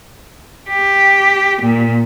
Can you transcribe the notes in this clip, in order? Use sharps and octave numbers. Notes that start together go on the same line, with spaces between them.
G4
A#2